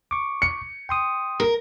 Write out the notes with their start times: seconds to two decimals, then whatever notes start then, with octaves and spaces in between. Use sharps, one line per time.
0.11 C#6 D6
0.42 C#7
0.89 G5 C6 D#6
1.40 A#4